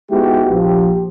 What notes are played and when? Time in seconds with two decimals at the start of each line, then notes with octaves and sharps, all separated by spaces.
0.12 G#3 B3 D#4 E4 F#4 G4
0.50 A#1 F3 G4